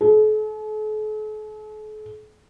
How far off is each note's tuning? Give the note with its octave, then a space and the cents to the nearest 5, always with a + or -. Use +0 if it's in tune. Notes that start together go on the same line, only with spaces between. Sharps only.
A4 -45